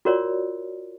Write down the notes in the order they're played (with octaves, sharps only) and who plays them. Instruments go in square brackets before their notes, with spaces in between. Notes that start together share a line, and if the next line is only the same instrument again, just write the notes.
[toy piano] F4 F#4 A#4 C#5 D5